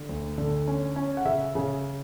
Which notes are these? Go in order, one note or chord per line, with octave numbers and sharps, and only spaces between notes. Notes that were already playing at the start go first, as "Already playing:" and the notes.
Already playing: D3
D2
D3
C#4
C#4
F#5
C#3 E5
C#3